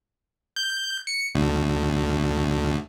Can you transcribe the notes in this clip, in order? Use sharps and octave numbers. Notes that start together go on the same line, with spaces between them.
G6
C#7
D2